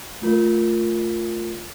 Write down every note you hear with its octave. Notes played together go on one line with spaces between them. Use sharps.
A3 F4 A#4